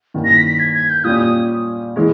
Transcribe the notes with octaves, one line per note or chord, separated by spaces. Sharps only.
G2 D#3 A#3 C#4 E4
A#6
B6
B6
G#6
G#6
G6
A#2 G3 C#4 D#6
D#6
E3 G#3 C#4